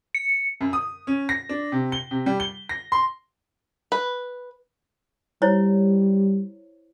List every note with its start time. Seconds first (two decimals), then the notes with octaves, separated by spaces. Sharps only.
0.15 C#7
0.61 F#2
0.73 D#6
1.07 C#4
1.29 A#6
1.49 D4
1.72 C3
1.92 G7
2.11 C3
2.26 G3
2.40 G7
2.69 A#6
2.92 C6
3.92 B4
5.42 G3 E4 C5 C#5